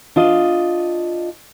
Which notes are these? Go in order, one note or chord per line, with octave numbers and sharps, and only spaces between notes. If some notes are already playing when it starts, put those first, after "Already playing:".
D4 F4 D#5